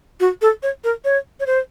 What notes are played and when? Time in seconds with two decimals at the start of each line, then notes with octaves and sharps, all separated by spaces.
0.20 F#4
0.42 A4
0.63 C#5
0.84 A#4
1.05 C#5
1.40 C#5
1.46 C5